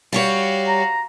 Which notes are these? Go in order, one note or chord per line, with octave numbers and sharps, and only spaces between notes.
G3 F#4 G4 C#5 F5
A#5